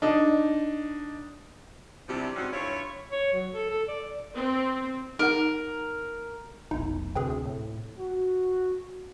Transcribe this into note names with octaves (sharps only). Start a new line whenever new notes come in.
D4 D#4
C3 F3 G3 D4 E4 G4
G#2 C3 C4 C#4 F#4
G2 E4 F4 C#5
C#5
F#3
A4
A4
D5
C4
D#4 A#4 F#5
F1 B1 D#4 E4
D2 C3 G#4 B4 G5
A2
F#4